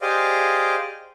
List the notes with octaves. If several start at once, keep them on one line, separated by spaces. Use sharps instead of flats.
G4 G#4 C5 D5 D#5 F5